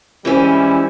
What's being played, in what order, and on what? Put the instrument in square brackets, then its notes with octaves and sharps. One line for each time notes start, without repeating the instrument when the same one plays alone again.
[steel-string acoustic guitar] E3 C4 C#4 [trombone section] G3 G#3 E4